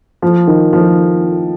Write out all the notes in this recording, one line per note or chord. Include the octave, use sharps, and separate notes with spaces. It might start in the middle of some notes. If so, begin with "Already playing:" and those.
F3
D#3
F3